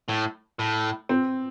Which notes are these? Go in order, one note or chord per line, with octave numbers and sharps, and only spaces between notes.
A2
A2
C4